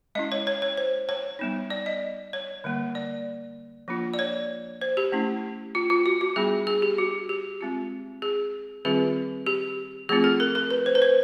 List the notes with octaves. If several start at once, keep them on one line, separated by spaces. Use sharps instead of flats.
G#3 C#4 E4 D#5
C#5
C#5
C#5
C5
C#5
G3 B3 D#4
D5
D#5
C#5
D3 G3 A#3
D5
F3 A#3 D4 F4
D5
C#5
C5
G4
A3 C#4 E4
F4
F4
F#4
F#4
G3 B3 D4 G#4
G#4
G4
F#4
G4
G#3 C4 F4
G#4
D#3 G3 C4 F4 G#4
G4
F3 A3 C4 F4 G#4
A4
A#4
A#4
B4
C5
B4
C5